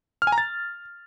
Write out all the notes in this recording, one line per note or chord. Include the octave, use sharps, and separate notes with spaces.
F6
G#5
A#5
A6